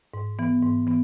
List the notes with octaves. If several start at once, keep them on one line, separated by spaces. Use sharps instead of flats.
G#2
E3 B3
G#2
E3 B3